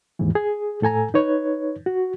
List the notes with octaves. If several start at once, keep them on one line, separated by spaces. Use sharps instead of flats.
D#2 G#2 E3
G#4
A2 A4 G#5 A#5
D#4 B4 C#5
F#4